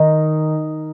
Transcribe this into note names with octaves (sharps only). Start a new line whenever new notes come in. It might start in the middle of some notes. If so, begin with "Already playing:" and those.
Already playing: D#3 D#4